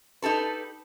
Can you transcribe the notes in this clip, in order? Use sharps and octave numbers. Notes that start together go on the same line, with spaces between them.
D#4 G4 A4 B4